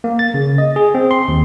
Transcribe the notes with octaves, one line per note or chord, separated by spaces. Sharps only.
A#3
A6
C#3
D#5
G#4
C4
C6
D#2